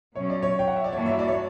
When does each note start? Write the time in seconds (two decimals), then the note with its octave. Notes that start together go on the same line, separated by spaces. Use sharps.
0.16 B2 F#3 C#4 C#5
0.30 D5
0.43 C#5
0.59 G5
0.68 F#5
0.76 E5
0.84 D5
0.93 G2 E3 A#3 D4 F#4 C#5
1.06 E5
1.19 D5
1.28 C#5
1.32 D5